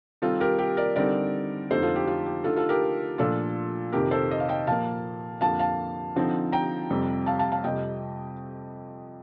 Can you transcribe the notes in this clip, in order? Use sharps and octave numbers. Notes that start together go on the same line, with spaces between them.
D#3 G3 C4 D#4 F4 A4
G4 A#4
G4
A#4 D5
D3 G3 C4 D#4 A#4 D5
F2 D3 F3 A3 D#4 A4 C5
F4 A4
G4
F4
G4
D3 A3 D#4 F4 A4
F4 A4
G4 A#4
A#2 F3 A3 D4 F4 A4
F2 C3 D#3 G4 A#4
A4 C5
D#5
F5
D#5 G5
A#2 F3 A#3 F5 A5
F2 D3 F3 A#3 F5 A5
F5 A5
D3 F3 C4 D#4
G5 A#5
F2 C3 G3 C4
F5 A5
F5 A5
F5 A5
F2 C3 G3 D#5 G5